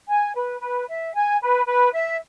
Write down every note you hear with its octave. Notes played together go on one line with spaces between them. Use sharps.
G#5
B4
B4
E5
G#5
B4
B4
E5